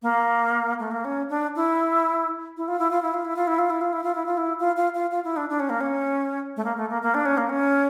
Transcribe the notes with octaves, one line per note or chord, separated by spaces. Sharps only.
A#3
A3
A#3
C#4
D4
E4
E4
F4
E4
F4
E4
F4
E4
F4
E4
F4
E4
F4
E4
F4
E4
F4
E4
F4
F4
F4
F4
E4
D4
D4
C#4
A#3
C#4
A3
A#3
A3
A#3
A#3
D4
C#4
A#3
C#4